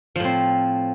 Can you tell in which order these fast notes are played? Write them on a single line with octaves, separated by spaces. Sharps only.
F3 A2 C4